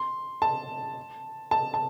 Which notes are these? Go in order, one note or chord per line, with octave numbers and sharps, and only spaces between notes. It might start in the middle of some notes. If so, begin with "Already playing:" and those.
Already playing: C6
A5
A5
A5